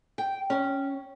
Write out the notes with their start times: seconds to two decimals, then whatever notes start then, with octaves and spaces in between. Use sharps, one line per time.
0.18 G5
0.50 C#4